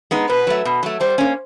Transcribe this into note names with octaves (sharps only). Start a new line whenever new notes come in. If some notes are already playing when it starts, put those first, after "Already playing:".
G#3 B3 D#4
B2 B4
F#3 A3
B2
F#3 A3
G3 C5
A#3 C#4